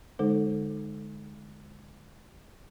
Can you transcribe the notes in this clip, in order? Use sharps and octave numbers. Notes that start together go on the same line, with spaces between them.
D3 G#3 D#4 A4 C5